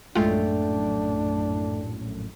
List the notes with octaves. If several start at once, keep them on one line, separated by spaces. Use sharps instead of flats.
A#1 F#2 A2 G#3 A3 D4 F4 G5